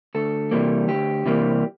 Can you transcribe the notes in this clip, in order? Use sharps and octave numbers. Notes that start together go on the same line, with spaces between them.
D2 A4
C3 E3 G3 A#3
D2 G4
C3 E3 G3 A#3